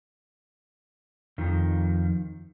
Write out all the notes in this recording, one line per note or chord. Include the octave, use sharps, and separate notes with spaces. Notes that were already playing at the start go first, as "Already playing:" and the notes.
F2 D#3 F3